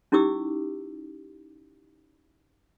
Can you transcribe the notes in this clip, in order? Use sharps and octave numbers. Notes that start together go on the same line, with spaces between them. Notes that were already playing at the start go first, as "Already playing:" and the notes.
C#4 D#4 E4 G4 D6 E6